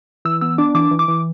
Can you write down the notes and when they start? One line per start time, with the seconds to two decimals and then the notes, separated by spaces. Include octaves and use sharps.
0.25 E3 E6
0.41 B3 E6
0.58 D4 D6
0.75 E3 D6
0.91 E3
0.99 D6
1.08 E3